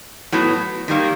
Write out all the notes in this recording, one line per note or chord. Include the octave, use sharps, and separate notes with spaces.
A2 F#3 B3
D#3 G3 A#3